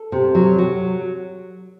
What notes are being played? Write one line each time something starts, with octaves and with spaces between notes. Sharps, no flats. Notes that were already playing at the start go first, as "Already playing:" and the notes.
Already playing: A4
C3
F#3
F#3